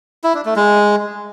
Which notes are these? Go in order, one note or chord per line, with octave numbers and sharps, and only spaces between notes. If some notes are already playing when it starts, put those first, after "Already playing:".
E4
D4
A3
G#3